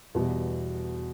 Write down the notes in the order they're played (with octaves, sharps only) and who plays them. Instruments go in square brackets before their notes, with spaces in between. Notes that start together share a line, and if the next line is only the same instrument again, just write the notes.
[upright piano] E2 B2 G3